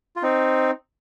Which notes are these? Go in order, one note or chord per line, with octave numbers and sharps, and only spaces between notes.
F4
C4 D#4